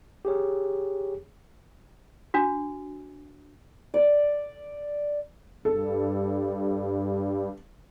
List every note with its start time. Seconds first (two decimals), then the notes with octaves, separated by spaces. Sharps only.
0.25 G4 G#4 C#5
2.34 D4 F#4
3.94 D5
5.65 G2 A4